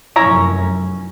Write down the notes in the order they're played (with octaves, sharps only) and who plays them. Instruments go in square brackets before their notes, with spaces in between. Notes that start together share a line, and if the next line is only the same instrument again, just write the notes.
[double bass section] F1 F#2 [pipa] C#4 E4 A#5